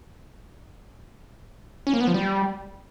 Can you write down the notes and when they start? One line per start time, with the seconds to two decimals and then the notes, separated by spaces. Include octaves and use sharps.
1.87 C#4
1.94 A#3
2.01 B3
2.07 F3
2.14 G3